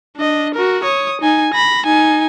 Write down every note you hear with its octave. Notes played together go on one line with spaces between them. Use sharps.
D4 D#5
F#4 A#4
C#5 D#6
D#4 G#5
B5 A#6
D#4 G#5